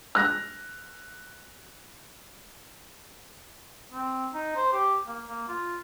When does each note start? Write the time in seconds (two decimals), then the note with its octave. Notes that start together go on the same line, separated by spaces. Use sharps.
0.15 F6 F#6 A#6
3.91 C4
4.34 D#4
4.56 C5
4.73 G4
5.07 A#3
5.25 A#3
5.48 F4